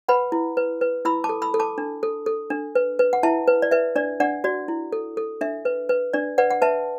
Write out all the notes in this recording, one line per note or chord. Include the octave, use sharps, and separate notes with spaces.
B4 F#5 B5
E4
B4
B4
E4 B5 E6
A5 D6
A4
B5 E6
A4
A5 D6
D4
A4
A4
D4
B4
B4
F#5
E4 E5 A5
B4
D5
B4 E5
D4 D5
D4 D5 F#5
F#4 D5
E4
A4
A4
D4 E5
B4
B4
D4 D5
B4 D5 F#5
F#5
B4 E5 A5